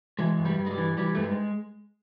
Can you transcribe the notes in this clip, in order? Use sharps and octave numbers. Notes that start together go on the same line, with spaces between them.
E3 G#3
G2
G3
G2
G#3
G3
E3
E3 G3
G2 A3
G#3